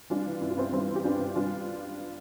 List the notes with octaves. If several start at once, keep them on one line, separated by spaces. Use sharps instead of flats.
G3 D4 F4
E3
G2 E4
F4
G2 C4 E4
G3 C4 E4
E3
G4
G2 D4 F4
G2
G3 D4 F4